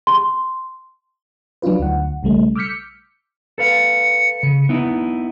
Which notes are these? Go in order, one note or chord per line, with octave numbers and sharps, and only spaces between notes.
C6
F#3 D4 D#4 F4 B4
D2 F#5
B1 C#3 G3 A3
D6 E6 F6 G6 B6 C#7
A4 B4 F5 C#7
C#3
B3 D#4 E4